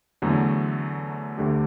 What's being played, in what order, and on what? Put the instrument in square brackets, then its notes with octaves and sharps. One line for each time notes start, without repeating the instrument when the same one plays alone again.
[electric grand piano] E2 D3 F#3 A3
D2 D3 A3 D4 G4